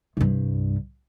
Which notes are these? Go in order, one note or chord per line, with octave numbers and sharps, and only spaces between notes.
C2 G2